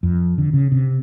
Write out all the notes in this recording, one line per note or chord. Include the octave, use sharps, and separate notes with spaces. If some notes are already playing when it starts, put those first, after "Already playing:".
F2
D3
C#3
C3